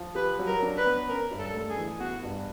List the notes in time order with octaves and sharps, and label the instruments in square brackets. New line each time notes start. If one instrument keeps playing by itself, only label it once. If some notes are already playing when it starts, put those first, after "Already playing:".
Already playing: [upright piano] F3
[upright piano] G4 [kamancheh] B4
[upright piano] F#3
[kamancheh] A#4
[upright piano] D4
[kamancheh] B4
[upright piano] B3
[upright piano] C#4 [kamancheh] A#4
[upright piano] G2
[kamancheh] A4
[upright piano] A3
[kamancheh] G#4
[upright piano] E3
[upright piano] B3 [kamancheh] F#4
[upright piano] G2